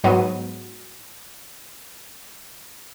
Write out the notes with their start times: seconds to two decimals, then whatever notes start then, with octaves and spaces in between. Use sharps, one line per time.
0.04 G#2 F#3 B3 D#7